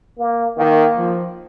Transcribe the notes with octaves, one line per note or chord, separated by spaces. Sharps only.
A#3
D#3 A#3
F3